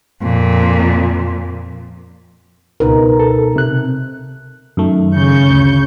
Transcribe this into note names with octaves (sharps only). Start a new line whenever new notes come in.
F2 A#2
C#2 B2 D#4 A#4 B4
A4
C3 F#6
F#2 D#3 A3
C#3 C#6 G6
D2